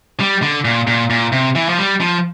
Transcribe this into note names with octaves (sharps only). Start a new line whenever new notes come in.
G3
D3
A#2
A#2
A#2
C3
E3
F3
G3
F3